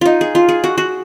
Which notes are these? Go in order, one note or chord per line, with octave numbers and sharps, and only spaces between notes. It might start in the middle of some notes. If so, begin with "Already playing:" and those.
D#4 F4
G#4
F4
G#4
F#4
F#4